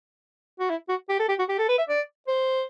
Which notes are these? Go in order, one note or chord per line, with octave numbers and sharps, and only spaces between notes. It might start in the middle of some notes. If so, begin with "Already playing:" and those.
F#4
E4
F#4
G4
A4
G4
F#4
G4
A4
B4
E5
D5
C5